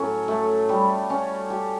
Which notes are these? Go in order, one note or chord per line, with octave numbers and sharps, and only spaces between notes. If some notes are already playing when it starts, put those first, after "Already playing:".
Already playing: A2 F#3 C#4
A3
G3
C#4
G4